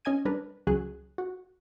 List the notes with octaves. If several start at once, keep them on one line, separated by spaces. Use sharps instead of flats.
C#4 D#5 G#5 G#6 D#7
G3 D4 A#4 B4
C#2 F#3 G#4 F#6
F#4